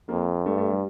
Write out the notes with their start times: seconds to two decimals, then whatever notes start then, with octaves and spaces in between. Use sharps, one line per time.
0.09 F2 A#3
0.46 G2 A3
0.58 A3
0.70 G3